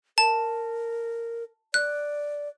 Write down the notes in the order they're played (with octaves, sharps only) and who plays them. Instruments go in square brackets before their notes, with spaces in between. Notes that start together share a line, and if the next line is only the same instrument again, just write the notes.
[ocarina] A#4 [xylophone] A5
[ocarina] D5 [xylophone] F#6